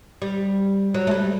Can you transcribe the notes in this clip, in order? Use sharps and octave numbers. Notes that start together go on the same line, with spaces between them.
G3
F#3
A3
G3